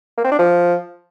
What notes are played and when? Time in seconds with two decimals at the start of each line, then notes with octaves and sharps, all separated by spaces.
0.18 A#3
0.25 C4
0.32 D4
0.39 F3